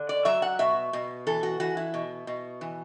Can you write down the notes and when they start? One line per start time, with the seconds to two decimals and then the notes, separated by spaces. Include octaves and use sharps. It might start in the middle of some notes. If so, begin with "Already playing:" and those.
Already playing: D3
0.09 D5
0.25 F#3 E5
0.42 F#5
0.59 B2 E5
0.93 B2
1.27 E3 A4
1.43 F#4
1.60 E3 F#4
1.77 E4
1.94 B2
2.27 B2
2.61 E3